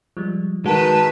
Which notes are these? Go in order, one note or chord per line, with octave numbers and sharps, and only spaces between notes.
F3 G3 G#3
D#3 G#3 F#4 A#4 B4 A5